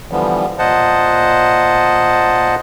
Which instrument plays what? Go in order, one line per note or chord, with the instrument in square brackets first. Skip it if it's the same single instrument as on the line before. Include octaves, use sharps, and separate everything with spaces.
[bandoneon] D3 E3 F3 G3 B3
A#2 C5 D#5 F#5 A5